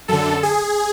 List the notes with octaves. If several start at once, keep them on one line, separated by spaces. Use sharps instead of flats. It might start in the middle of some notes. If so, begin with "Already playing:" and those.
F#2 D3 A4
G#4